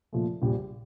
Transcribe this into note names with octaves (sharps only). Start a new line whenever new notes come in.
A#2 F3 A3
A#1 A#2 G3